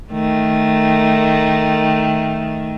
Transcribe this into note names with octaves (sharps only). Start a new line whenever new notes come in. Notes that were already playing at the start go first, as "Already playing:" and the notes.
D#3 A3